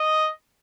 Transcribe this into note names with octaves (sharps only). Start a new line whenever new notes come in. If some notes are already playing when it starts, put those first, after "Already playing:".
Already playing: D#5